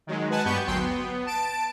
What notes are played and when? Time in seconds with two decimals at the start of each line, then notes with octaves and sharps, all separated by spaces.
0.07 D#3 F#3 G#3
0.30 B4 F#5 G#5 A5
0.45 G2 B3 G4 B4 C#6 G6
0.66 G#1 D2 F#3 G5 C6
0.79 B3
1.26 A5 D7